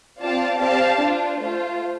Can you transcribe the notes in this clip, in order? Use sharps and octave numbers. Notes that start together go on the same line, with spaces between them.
C4 F4 D5 F5 A5
C4 G4 D5 F5 A5
D4 F4 C5
A3 F4 C5